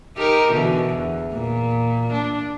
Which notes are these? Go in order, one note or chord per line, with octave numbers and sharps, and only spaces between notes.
D#4 G4 A#4
B2 D3 E3
E2
A#2
D4